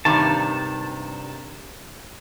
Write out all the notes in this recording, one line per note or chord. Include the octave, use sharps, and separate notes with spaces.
G2 C3 D#3 A5